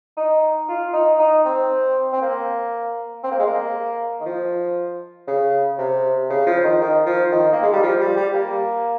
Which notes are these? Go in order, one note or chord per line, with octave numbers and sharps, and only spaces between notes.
D#4
F4
D#4
D#4
C4
C4
A#3
C4
A#3
G#3
A#3
D#3
F3
C#3
C3
C#3
F3
D#3
D#3
F3
D#3
A#3
G#3
G3
F3
G3
G3
A#3